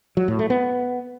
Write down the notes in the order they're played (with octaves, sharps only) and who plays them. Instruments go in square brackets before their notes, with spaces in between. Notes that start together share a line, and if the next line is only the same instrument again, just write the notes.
[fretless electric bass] F#3
A2
A3
B3